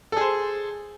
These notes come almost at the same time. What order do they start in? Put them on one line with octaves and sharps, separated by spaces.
A4 G#4 C5